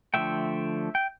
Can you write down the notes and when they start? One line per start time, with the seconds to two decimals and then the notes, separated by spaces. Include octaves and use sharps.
0.14 D3 F3 A3 E5 G5
0.95 G5